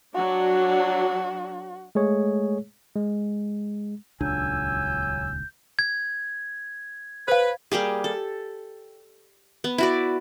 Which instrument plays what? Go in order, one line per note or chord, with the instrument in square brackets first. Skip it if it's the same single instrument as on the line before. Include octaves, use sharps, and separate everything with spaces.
[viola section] F#3 D4 [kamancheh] F#4
[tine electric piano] G#3 A3 G#4 C#5
G#3
[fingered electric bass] D#1 C#2 D4 [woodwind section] F#3 G#5 E6 [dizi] G6
[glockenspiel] G#6
[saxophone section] B4 [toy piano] C5 F5
[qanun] G3 A#3 G4 G#4
A4
B3
E4 F#4 D5